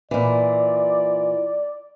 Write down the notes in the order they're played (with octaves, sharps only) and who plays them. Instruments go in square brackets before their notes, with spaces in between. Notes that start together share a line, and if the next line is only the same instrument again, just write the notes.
[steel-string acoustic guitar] A#2 E3 [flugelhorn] D5